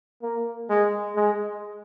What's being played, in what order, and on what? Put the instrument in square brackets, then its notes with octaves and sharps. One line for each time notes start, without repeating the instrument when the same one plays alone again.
[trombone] A#3
G#3
G#3